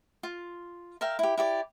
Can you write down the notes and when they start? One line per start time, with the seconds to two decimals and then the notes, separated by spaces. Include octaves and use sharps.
0.23 F4
1.01 A#4 E5 F5 G5
1.19 E4 G4
1.38 E4 G4 D5